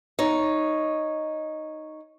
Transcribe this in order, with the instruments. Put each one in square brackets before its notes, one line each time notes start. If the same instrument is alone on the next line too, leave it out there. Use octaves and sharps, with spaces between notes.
[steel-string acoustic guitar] D#4 C#5